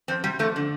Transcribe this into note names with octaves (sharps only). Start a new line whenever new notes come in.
F2 C4
C3 G3
F2 A3
D3